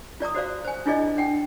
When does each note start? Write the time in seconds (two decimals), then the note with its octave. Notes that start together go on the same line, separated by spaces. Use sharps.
0.20 F4 D5 A#5 D#6
0.35 F#4 C5 D5 F5
0.64 C5 G#5
0.86 D4 E4 F4 G#4 D5 D#5
1.17 D4 F#5 G5